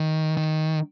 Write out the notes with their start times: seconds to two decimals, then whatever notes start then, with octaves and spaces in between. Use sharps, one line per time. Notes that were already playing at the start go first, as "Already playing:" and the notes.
Already playing: D#3
0.37 D#3